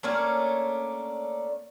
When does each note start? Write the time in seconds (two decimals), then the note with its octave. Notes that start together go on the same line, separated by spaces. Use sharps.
0.03 A3 A#3 C#4 D4